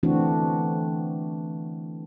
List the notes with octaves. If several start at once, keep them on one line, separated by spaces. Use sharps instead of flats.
D3 E3 A3 C4 D4 F#4